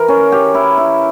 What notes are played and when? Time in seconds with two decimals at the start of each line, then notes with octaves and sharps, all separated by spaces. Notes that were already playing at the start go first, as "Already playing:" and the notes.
Already playing: E3 A#4
0.08 C#4
0.32 G4
0.55 E4
0.77 E4